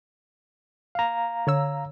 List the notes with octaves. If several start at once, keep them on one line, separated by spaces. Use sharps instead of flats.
F5 A#5
D3 C#5 E6